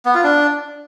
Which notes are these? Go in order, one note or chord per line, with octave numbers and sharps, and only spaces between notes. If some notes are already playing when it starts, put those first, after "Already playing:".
B3
F4
D4